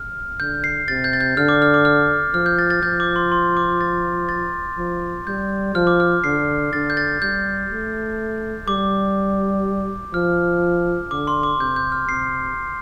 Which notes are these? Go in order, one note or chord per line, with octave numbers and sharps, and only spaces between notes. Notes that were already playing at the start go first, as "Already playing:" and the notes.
Already playing: F6
D3 G6
C7
C3 A6
G6
A6
G6
D3 F6
D6
F6
D6
F6
F3 F6
G6
A6
A6
F3 G6
D6
C6
C6
D6
A6
A6
F3
G3 G6
F3 F6
D6
F6
D3 C7
D3 A6
G6
A6
G3 G6
A3
G3 D6
F3 F6
D3 D6
C6
D6
C3 G6
G6
F6
C3 C7